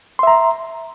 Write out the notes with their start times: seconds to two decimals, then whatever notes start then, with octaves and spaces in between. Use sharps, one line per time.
0.19 C6
0.23 E5
0.27 A#5